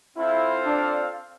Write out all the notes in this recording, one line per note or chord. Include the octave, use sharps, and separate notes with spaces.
C4 E4 F4 A4 C5 F5
D4